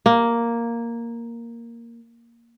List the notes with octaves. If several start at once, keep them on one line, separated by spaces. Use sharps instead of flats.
A#3